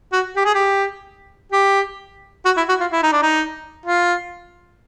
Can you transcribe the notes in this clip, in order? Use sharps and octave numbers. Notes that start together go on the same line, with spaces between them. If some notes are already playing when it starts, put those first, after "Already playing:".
F#4
G4
G#4
G4
G4
F#4
E4
F#4
F4
E4
D#4
D4
D#4
F4